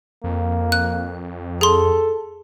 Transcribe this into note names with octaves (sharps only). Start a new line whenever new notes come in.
F2 A#3
F#6
G#4 A4 C6